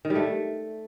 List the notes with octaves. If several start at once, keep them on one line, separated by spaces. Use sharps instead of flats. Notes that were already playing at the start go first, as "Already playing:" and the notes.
D#3
G3
A3